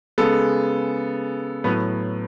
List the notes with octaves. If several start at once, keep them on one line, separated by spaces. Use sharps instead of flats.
C#3 G#3 B3 A4
A2 F#3 B3 B4